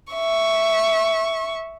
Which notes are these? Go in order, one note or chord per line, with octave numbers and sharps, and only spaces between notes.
E5 C#6